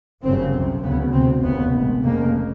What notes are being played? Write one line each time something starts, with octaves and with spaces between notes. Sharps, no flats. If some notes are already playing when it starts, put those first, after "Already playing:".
G1 F#2 C#3 C4
C2 C3
D2 C#3 B3
D2 C3 C4
F1 D#2 C#3 B3
A#1 G#2
F1 F2 C#3 A#3